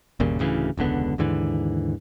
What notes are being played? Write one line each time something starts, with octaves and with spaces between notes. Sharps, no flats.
G1 D#2 A#2 C#3
D1 D2 C#3 E3
E1 C#2 D3 B3
D#2 G#2 D3 E3